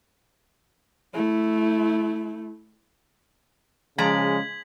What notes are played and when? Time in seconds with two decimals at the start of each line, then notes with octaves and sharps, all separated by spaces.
1.14 A3 E4
3.98 C#3 F3 G#3 D5 A#5 G#6 B6 F#7